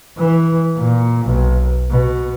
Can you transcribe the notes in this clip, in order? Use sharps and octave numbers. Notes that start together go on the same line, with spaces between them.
E3
A#2
B1
B2